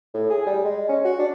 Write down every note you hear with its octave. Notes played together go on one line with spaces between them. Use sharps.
A2
G#4
G3
G#3
C#4
F#4
D4